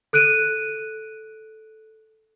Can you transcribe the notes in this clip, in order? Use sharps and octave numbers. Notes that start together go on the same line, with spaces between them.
A4 F#6 D7 D#7